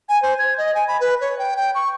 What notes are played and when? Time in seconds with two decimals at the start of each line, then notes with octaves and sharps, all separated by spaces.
0.09 G#5
0.22 C5
0.39 G#6
0.58 D#5
0.75 G#5
0.88 B5
1.01 B4
1.21 C#5
1.39 G5
1.57 G5
1.75 C#6